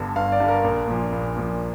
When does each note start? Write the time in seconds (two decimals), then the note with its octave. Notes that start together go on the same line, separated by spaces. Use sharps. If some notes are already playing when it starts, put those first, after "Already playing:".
Already playing: G1 G2 D3
0.16 G1 F5
0.32 D5
0.40 G2 D3
0.48 A#4
0.64 A#1
0.88 A#2 F3
1.12 A#1
1.37 A#2 F3